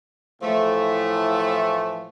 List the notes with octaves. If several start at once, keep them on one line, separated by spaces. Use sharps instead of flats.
A2 E3 F3 A3